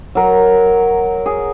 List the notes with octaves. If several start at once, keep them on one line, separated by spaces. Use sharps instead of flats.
F#3 A#4
G#4